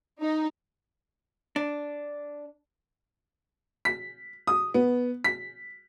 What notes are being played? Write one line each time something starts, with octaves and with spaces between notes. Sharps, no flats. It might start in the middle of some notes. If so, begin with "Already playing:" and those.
D#4
D4
B6
D#6
B3
B6